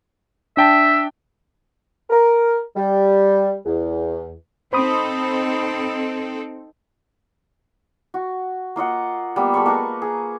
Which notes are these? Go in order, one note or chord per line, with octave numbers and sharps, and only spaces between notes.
D4 E5 G5 A5
A#4
G3
E2
C4 D#4 A4 C5 B5 D#6
F#4
A#3 F4 D#5 F#5
G3 A#3 B3
G#3 A4 B5 C#6
A#3 B4 A5 A#5
G#4